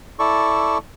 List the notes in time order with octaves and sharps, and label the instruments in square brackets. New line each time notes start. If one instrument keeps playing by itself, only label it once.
[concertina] E4 A4 D5 C#6